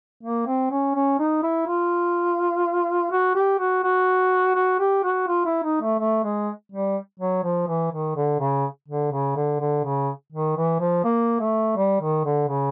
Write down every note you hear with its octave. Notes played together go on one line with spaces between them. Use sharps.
A#3
C4
C#4
C#4
D#4
E4
F4
F#4
G4
F#4
F#4
F#4
G4
F#4
F4
E4
D#4
A3
A3
G#3
G3
F#3
F3
E3
D#3
D3
C#3
D3
C#3
D3
D3
C#3
D#3
E3
F3
A#3
A3
G3
D#3
D3
C#3